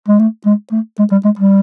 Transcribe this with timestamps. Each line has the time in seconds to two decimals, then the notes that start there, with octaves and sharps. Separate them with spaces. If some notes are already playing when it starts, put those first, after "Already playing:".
0.09 G#3
0.19 A3
0.46 G#3
0.72 A3
0.99 G#3
1.12 G3
1.25 G#3
1.39 G3